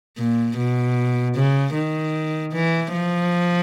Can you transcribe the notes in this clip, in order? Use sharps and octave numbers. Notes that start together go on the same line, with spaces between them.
A#2
B2
C#3
D#3
E3
F3